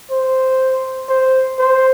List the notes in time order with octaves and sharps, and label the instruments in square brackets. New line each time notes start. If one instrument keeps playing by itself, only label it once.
[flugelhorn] C5
C5
C5